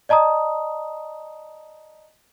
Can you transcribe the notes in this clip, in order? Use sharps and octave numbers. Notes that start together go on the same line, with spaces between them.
D5 D#5 A5 A#5 D#6